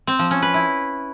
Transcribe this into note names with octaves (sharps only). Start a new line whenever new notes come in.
C4
F3
C#4
B4
E4